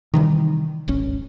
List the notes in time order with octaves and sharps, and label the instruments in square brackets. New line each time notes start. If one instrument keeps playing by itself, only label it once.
[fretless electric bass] C3 E3 G3 [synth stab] D#3
[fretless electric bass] D1 G#1 C#4